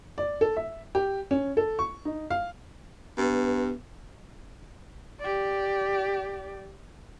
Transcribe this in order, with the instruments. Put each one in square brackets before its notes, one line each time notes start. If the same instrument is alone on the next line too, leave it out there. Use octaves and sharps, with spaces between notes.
[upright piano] D5
A4
E5
G4
C#4
A4
C#6
D#4
F5
[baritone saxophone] G2 [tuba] B3
[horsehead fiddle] G4 D5